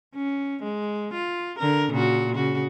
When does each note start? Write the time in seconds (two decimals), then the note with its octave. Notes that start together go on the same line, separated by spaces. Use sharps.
0.15 C#4
0.63 G#3
1.13 F4
1.59 D3 A#4
1.91 A#2 C#3 F#4
2.34 C#3 F#4